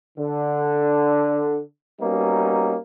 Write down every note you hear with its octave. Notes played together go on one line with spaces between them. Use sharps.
D3
G3 A#3 B3 C#4 D#4 F#4